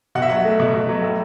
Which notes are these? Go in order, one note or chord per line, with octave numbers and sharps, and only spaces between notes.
B2 F#5
E5
F#3 F#5
A3
B2
B2
F#3
A2